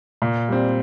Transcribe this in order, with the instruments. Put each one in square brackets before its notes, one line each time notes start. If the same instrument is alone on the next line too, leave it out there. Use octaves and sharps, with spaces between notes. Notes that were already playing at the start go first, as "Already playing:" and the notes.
[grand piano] A#2
G3 C4